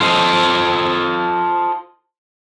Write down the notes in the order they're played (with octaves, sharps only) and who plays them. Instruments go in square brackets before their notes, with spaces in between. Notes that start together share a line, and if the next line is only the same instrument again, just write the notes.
[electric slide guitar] F4 A4 C5 D#5